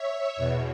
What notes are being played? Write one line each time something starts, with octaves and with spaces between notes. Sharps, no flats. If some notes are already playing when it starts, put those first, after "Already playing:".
Already playing: C#5 E5
E2 B2